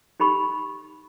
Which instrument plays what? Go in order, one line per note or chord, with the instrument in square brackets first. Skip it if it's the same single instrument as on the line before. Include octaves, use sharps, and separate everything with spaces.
[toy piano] D#4 G4 B5 C#6